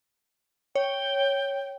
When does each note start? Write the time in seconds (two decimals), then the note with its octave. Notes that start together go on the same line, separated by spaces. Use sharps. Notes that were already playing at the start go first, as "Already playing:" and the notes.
0.75 C#5 G5